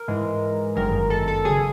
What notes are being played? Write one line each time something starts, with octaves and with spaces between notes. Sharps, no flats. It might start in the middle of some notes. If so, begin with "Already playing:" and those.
Already playing: A#4
G#2 E3 G#3
G1 F#2 D#3 G#3 A#4
A4
A4
C#3 F#3 G#4